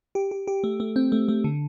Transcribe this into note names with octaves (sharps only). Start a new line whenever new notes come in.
G4
G4
G4
A3
A3
C4
A3
A3
D3